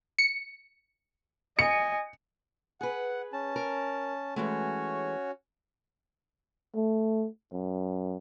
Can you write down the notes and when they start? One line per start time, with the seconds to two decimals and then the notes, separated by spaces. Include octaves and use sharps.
0.19 C#7
1.59 D#5 G#5 C#7
2.81 G#4 B4 F#5
3.33 C#4 A5
3.56 A#4
4.36 E3 G#3 A3 C#4 F#4 C#5
6.75 A3
7.53 F#2